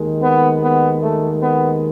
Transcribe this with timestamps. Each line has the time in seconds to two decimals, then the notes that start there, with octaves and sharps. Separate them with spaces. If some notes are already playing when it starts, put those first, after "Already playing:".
Already playing: D#2 D#3 G#3
0.22 B3
0.62 B3
1.02 A3
1.42 B3